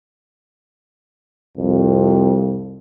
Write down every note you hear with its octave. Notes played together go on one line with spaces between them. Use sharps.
C2 F2